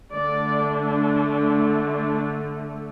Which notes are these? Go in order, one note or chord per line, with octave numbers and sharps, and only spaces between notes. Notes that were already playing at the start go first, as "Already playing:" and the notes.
D3 A3 D4 D5
D4